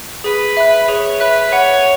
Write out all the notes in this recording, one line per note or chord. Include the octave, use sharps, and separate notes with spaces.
G#4 B4
E5 B5 F#6
G#4 C#5
B4 E5 B5 F#6
C#5 F#5